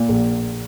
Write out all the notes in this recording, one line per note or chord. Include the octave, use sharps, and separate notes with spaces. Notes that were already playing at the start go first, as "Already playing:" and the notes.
Already playing: A#2
A#1